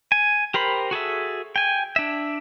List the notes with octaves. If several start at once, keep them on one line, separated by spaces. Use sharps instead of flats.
G#5
G4 A#4 C5 B5
F#4 G#4 A4 E5
G5 G#5
D4 E5